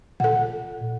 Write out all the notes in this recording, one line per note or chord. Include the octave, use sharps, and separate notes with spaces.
A#2 A4 F#5